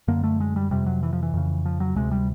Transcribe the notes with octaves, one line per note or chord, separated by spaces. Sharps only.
F#2 D3 A#3
A3
G#3
G3
F2 C3 G3
F#3
E3
F3
E3
F2 C#3
F3
F#3
D2 C3 G#3
G3